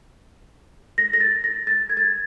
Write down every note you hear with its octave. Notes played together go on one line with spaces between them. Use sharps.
A#6
A#6
A6
A#6
A6
G#6
A6
G#6